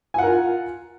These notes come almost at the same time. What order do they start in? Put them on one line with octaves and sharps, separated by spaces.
G#5 F#5 A#4 F4